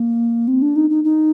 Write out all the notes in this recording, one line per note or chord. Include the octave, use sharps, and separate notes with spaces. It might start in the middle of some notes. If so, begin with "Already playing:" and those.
Already playing: A#3
C4
D4
D#4
D#4
D#4